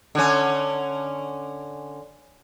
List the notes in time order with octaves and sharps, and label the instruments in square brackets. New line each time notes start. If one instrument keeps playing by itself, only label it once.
[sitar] D3 C#4